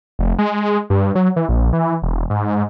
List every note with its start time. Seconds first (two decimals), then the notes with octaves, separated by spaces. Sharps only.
0.19 F1
0.39 G#3
0.90 G2
1.15 F#3
1.36 E3
1.49 A#1
1.73 E3
2.03 E1
2.30 G#2